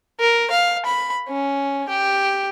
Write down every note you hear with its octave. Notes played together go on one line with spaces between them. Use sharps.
A#4
F5
B5
C#4
G4